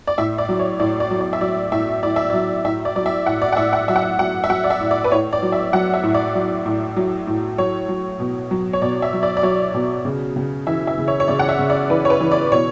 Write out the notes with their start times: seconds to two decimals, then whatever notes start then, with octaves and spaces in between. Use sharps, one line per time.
0.07 D5
0.18 A2 E5
0.38 D5
0.49 F#3
0.59 C#5
0.80 A2 D5
1.00 D5
1.11 F#3
1.21 D5
1.33 E5
1.41 F#3 D5
1.72 A2 E5
2.03 A2 D5
2.16 E5
2.30 F#3 D5
2.64 A2 E5
2.85 D5
2.95 F#3 D5
3.06 E5
3.26 A2 F#5
3.42 D5
3.52 F#5
3.57 A2 E5
3.73 F#5
3.88 F#3 E5
3.96 F#5
4.03 E5
4.19 F#3 F#5
4.44 E5
4.49 F#3 F#5
4.64 D5
4.70 E5
4.80 A2
4.91 D5
5.04 B4
5.12 A2 C#5
5.33 D5
5.42 F#3
5.52 E5
5.73 F#3 F#5
5.94 E5
6.03 A2
6.14 D5
6.35 F#3
6.66 A2
6.96 F#3
7.27 A2
7.58 F#3 C#5
7.89 F#3
8.20 B2
8.51 F#3
8.73 C#5
8.82 B2 D5
9.02 E5
9.13 F#3
9.23 D5
9.37 D5
9.43 F#3 C#5
9.74 B2
10.05 C#3
10.36 C#3
10.67 E3 E5
10.87 E5
10.98 C#3
11.08 C#5
11.20 C#5
11.28 C#3 D5
11.39 F#5
11.49 E5
11.59 C#3
11.70 D5
11.90 E3 B4
12.05 C#5
12.10 B4
12.20 E3
12.32 D5
12.52 B2 C#5